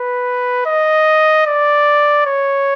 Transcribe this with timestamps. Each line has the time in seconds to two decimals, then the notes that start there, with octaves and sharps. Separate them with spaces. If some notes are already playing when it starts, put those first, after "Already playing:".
Already playing: B4
0.66 D#5
1.46 D5
2.26 C#5